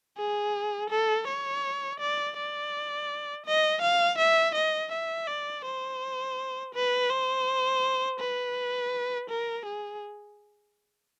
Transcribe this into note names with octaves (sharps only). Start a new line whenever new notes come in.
G#4
A4
C#5
D5
D5
D#5
F5
E5
D#5
E5
D5
C5
B4
C5
B4
A#4
G#4